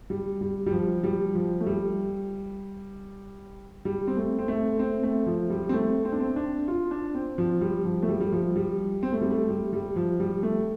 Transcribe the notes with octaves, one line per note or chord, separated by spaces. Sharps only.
G3
G3
G3
F3
G3
F3
A3
G3
G3
C4
A3
C4
A3
C4
A3
F3
G3
C4
A3
C4
D4
C4
D4
F4
D4
C4
F3
G3
F3
A3
G3
G3
F3
G3
C4
A3
G3
A3
G3
G3
F3
G3
A3